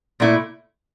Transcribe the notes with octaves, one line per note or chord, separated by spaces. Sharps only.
A#2 A3 E4